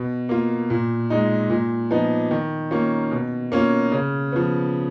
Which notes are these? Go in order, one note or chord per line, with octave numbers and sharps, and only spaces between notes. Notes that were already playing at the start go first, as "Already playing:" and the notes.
Already playing: B2
A#3 F4
A#2
G#3 D#4
A#2
F3 B3 D#4
D#3
A#3 C#4 F4
B2
A#3 C#4 F4
C#3
F3 B3